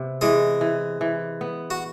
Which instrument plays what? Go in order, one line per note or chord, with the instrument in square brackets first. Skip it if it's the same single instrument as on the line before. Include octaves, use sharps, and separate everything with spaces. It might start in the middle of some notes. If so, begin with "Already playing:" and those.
Already playing: [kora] C3 B3
[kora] E3 [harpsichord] G#3 G#4
[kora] E3
E3
B3
[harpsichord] F#4